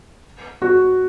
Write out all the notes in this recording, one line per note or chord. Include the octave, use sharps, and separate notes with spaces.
F#4